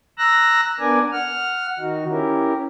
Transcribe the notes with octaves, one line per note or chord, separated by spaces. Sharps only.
A#5 E6 F#6 A#6
B3 D4 A#4 D5 G#5
F#5 F6
D#3 D#4 F#4
C#4 E4 G4 A#4